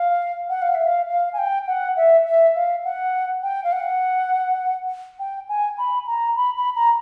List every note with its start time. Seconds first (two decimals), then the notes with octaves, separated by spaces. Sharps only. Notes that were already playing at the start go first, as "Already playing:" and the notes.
Already playing: F5
0.49 F#5
0.62 F5
0.75 E5
0.87 F5
1.09 F5
1.33 G#5
1.38 G5
1.67 F#5
1.97 E5
2.26 E5
2.56 F5
2.84 F#5
3.43 G5
3.64 F5
3.72 F#5
5.19 G5
5.49 G#5
5.78 B5
6.07 A#5
6.37 B5
6.56 B5
6.76 A#5